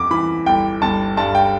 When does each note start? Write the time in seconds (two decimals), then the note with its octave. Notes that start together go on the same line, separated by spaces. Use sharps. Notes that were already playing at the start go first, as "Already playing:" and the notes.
Already playing: F2 D6
0.11 E3 B5
0.46 G1 G5
0.82 G1 A5
1.17 G2 A5
1.35 G5